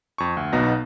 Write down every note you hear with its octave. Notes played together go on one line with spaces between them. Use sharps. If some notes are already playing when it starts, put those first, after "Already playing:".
F2 C#6
D2
B1 B2 B3 D#4 A#6